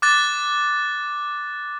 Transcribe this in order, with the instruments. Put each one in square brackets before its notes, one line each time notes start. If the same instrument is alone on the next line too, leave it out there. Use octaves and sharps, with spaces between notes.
[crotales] D6 F#6 A6